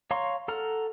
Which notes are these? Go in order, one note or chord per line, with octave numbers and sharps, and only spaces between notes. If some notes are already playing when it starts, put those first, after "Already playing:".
C#5 F5 A#5 C6 C#6
A4 F#5 A#5 F6